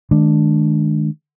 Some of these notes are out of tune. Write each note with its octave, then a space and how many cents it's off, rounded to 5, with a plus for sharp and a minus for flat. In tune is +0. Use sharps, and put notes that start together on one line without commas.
D#3 +0 G#3 +45 D4 +0